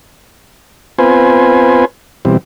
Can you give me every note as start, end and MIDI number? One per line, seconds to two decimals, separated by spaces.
0.99 1.85 59
0.99 1.85 60
0.99 1.85 65
0.99 1.85 71
0.99 1.85 72
0.99 1.85 80
2.25 2.37 47
2.25 2.37 52
2.25 2.37 55
2.25 2.37 60